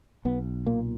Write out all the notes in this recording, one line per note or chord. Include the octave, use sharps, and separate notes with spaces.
B1 B3
A#2 A#3